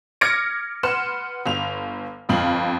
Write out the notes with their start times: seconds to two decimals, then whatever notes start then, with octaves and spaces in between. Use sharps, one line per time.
0.21 D6 F6 G#6 A#6 C#7 D7
0.83 B4 F#5 C6 F6 E7
1.46 G1 F7
2.29 G1 F2 F5 F#7